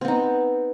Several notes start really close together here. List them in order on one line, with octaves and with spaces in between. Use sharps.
C4 B3 D#4